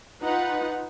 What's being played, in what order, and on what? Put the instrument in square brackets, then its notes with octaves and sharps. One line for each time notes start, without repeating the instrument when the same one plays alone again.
[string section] D#4 F4 B4 F#5